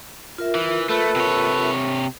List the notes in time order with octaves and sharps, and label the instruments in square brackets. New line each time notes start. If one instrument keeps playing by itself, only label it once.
[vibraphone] F4 A#4 E5
[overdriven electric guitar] E3
[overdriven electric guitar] A3 [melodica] A4 B4
[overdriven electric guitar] C3 C#5